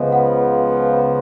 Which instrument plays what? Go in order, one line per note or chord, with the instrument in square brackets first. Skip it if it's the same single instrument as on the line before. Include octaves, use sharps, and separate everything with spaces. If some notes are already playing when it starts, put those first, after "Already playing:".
Already playing: [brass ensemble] C#2 C#3 F3 B3 [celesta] D#5
[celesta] F#5